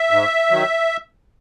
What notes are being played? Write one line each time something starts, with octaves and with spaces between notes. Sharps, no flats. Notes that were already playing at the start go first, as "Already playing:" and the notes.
Already playing: E5
G#2
D#3 F#3